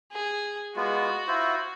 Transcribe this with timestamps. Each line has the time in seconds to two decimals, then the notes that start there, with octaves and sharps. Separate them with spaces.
0.13 G#4
0.76 G#3 B3 F4 F#4
1.28 E4 F4 C5